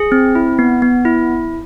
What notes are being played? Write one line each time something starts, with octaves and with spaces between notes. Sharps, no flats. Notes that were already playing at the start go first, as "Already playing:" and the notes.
Already playing: G#4
C4
E4
B3
B3
E4